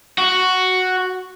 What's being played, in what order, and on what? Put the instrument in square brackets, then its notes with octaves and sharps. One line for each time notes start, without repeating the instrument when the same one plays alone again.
[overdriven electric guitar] F#4